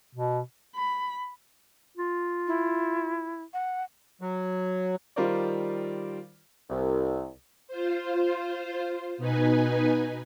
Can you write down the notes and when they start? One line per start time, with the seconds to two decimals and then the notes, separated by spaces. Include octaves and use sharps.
0.15 B2
0.75 B5
1.97 F4
2.47 E4
3.54 F#5
4.21 F#3
5.16 D#3 G3 F4 A#4 C5 D5
6.70 C2
7.68 F4 C5
9.18 B2 D#4 B4 G#5